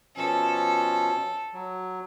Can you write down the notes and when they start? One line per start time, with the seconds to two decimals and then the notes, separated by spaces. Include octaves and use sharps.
0.16 B2 F3 C#4 A4
1.53 F#3